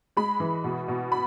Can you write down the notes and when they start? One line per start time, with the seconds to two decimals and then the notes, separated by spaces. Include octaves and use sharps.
0.17 G#3 B5
0.40 E3
0.64 B2
0.88 B2
1.12 B5